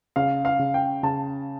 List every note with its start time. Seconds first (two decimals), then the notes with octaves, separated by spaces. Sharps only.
0.16 C#3 F5
0.45 F5
0.59 C#3
0.74 G5
1.03 C#3 A5